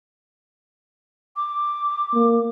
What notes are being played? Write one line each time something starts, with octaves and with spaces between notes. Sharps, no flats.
D6
A#3